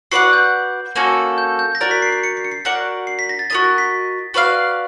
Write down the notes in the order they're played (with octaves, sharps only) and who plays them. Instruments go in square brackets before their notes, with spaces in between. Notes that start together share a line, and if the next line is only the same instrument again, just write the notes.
[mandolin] F#4 B4 D5 F#5 [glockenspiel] C7
[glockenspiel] G6
[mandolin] A#3 C#4 F#4 A4
[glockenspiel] G6
G6
A#6
[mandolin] F#4 A#4 D5 [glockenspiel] A6
[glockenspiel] B6
C7
C7
C#7
C7
C#7
C7
[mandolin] F#4 A#4 D5 F#5 [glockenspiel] C#7
[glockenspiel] C7
B6
A#6
A6
[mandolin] F#4 A#4 D#5 [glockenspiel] A6
[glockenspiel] A#6
B6
[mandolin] F#4 B4 D5 F5